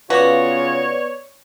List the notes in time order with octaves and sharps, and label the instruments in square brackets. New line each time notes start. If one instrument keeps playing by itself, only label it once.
[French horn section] C#3 F4 [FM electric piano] B3 D5 [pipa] F#4 [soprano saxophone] C#5